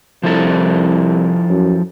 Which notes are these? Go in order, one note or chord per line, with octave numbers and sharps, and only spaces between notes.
C2 F3 E4 A4
F#2